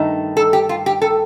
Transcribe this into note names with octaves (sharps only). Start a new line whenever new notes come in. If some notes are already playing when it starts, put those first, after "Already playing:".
Already playing: G2 D#3 A3 D#4
A4
G4
F4
G4
A4